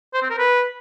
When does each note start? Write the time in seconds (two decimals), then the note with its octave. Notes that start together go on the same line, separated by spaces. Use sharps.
0.14 C5
0.22 C4
0.30 A#4
0.38 B4